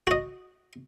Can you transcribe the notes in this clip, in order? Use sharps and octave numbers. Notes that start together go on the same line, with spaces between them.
F#4 D#5